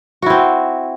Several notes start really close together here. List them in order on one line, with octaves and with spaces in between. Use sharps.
F#4 E4 C4